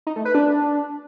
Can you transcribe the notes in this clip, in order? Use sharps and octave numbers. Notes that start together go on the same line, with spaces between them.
D#4
A3
B4
D4